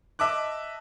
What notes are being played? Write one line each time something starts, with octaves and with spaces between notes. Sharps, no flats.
D#5 E5 A5 D6 F#6